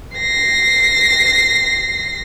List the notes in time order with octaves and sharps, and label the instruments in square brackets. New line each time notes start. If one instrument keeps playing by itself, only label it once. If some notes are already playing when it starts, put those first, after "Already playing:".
[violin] A#6 C7